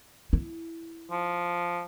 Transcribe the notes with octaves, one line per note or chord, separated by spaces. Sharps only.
E4
F3